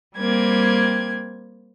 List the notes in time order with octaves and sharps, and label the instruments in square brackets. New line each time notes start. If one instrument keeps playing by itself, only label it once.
[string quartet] G3 A#3 C4 G#6